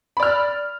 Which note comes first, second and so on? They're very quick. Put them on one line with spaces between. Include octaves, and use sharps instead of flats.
B5 D5 F6